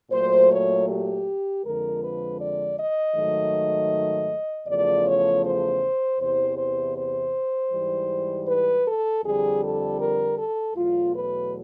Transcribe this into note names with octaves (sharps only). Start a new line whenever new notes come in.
A#2 F#3 A3 C5
C#5
G4
F2 D3 F3 G#3 A#4
B4
D5
D#5
G#2 D#3 F#3 A3
E2 C#3 F3 A3 D5
C#5
C5
E2 C3 E3 C5
C5
C5
G#2 E3 G3
B4
A4
F2 D3 G3 G#4
A4
A#4
A4
E2 B2 F#3 A3 F4
B4